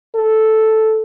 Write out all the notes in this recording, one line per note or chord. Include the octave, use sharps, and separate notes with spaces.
A4